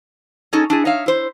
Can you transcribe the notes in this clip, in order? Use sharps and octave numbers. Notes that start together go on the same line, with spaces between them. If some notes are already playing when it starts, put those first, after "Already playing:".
C#4 D#4 G#4 A4
D4 E4 G#4
D#4 C#5 E5 F5
E4 C5